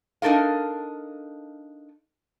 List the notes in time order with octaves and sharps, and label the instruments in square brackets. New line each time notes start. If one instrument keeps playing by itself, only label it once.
[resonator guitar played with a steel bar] D4 D#4 A4 A#4 F5